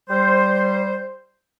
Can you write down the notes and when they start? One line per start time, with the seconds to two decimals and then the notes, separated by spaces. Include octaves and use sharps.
0.10 G3 C5